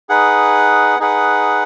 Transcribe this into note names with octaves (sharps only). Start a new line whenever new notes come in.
D#4 G#4 B4 F#5
D#4 G#4 B4 F#5